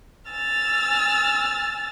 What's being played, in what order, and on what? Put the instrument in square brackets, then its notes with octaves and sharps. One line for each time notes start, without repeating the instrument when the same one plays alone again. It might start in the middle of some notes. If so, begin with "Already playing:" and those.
[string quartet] G#5 E6 F6 A6